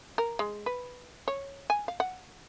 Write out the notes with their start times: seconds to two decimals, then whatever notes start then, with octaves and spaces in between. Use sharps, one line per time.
0.18 A#4
0.39 G#3
0.66 B4
1.28 C#5
1.70 G#5
1.88 F5
2.00 F#5